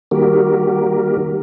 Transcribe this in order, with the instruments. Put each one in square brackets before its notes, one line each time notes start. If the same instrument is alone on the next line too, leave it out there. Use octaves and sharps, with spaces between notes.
[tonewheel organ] D#3 G3 A#3 F#4 G4 A#4